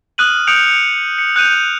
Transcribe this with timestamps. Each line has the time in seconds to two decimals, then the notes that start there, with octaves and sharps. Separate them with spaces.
0.18 D#6 F6 F#6 D#7 F#7
0.47 D#6 G6 C#7 D7 F7
1.18 C#7
1.36 F#6 G6 D#7 F7